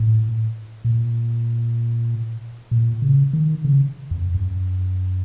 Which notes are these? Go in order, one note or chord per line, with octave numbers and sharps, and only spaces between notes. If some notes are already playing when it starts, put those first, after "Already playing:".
Already playing: A2
A#2
A#2
C#3
D#3
C#3
F2
F#2